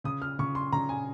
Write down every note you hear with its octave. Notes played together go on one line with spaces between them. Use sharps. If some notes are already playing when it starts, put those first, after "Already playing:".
C#3 D#6
F6
C#3 C#6
C6
C#3 A#5
G#5